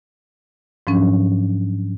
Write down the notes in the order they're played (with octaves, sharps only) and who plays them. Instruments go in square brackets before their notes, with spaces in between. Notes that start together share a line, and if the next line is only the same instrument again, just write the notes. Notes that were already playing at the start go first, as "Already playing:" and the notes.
[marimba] G#2 F3 F#3 C#4 D4